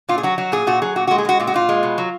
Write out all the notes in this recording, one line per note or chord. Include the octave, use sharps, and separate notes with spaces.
A#2 F4
G#4
F#3 F#4
F#3 F#4
A#2 G#4
A#2 F#4
F#3 G#4
A#2 F#4
G#3 F#4
G#4
G#3 F#4
A#2 F4
F#4
A#2 F4
G#3
B2
F#3